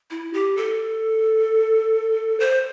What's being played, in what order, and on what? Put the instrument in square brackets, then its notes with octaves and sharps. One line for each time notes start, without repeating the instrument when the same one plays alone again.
[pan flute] E4
G4
A4
C5